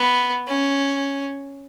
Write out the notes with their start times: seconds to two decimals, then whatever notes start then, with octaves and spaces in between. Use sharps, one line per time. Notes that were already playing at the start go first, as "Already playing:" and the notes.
Already playing: B3
0.47 C#4